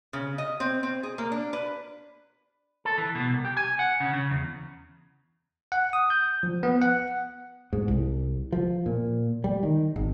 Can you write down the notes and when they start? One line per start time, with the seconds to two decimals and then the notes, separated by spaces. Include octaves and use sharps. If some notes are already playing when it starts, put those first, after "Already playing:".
0.13 C#3
0.38 D#5
0.60 C4
0.83 C4
1.03 G#4
1.18 A#3
1.32 D4
1.53 B4
2.85 A4
2.98 E3
3.15 B2
3.30 C2
3.45 G4
3.57 G#5
3.79 F#5
4.00 C#3
4.13 C#3
4.31 E2
5.72 F#5
5.93 D#6
6.10 G6
6.43 F3
6.63 B3
6.82 F#5
7.73 G#2
7.88 C2
8.52 F3
8.86 A#2
9.44 G3
9.63 D#3
9.96 G#1